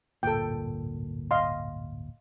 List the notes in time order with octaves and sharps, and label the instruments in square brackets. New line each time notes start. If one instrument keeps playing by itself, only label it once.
[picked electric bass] D1 G1 A#2 [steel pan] A4 G5
[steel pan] D#5 F5 C6